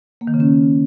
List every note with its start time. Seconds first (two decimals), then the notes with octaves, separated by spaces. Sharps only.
0.21 A#3
0.27 D#3
0.34 C#3
0.40 C#4